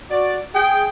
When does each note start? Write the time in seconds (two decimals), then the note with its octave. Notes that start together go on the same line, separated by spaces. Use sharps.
0.11 F#4 D5
0.55 G#4 G5